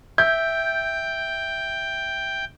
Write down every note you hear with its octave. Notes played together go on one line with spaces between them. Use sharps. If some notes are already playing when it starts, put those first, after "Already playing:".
E5 G5 G6